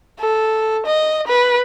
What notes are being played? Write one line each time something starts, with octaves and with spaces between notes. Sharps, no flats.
A4
D#5
B4